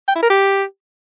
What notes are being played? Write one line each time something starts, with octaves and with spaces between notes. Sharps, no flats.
G5
E4
A#4
G4